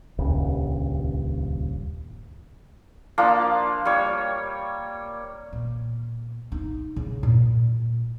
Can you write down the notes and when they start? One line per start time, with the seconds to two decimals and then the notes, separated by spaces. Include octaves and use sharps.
0.18 D#1 C#2 G2
3.18 F3 A#3 D4
3.85 G3 C#5
5.52 A#2
6.52 D#4
6.96 C#3
7.23 A#2